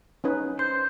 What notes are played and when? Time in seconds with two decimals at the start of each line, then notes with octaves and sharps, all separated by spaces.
0.24 C#4 D#4 B4
0.59 C5 G6